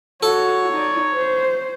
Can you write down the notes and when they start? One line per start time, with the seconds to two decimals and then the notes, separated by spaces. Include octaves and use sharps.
0.23 F#4 A4 C#5
0.73 D#4 D5
1.12 C5